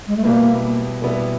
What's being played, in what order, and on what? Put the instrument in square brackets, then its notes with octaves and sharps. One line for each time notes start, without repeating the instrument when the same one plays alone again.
[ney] G#3
A3
[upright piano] B2 G3 B3 E4 [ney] A#3
[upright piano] B2 G3 B3 E4